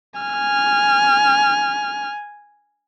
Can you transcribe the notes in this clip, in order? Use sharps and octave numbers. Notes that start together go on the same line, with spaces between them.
G#5 F6